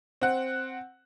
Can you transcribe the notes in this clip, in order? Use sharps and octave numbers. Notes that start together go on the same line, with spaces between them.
C4 F#5